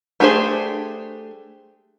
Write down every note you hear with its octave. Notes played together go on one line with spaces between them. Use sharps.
A3 D4 G4 G#4 C5